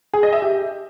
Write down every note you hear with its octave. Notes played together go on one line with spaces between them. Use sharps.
G#4
D#5
E5
G4